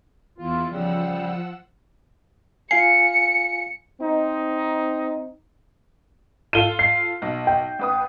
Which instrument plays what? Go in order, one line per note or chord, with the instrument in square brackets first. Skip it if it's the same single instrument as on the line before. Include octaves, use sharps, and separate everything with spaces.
[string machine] E2 E4 [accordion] F4
[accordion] C#3 G3 [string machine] F3 F#5 E6
[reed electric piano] F4 F5 G#5 [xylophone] C7 [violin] C#7
[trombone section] C4 D#4
[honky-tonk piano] F4 A4 [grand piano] D#7 G7
[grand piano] C7
[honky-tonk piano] B1
[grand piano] G5
[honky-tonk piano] A1 B4 D#6